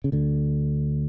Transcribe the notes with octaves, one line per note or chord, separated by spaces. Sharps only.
C#3
D2 D3